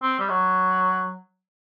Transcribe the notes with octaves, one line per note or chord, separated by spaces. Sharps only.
C4
G3
F#3